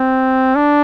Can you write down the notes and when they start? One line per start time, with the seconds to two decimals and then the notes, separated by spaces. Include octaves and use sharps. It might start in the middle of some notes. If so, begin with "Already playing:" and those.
Already playing: C4
0.55 D4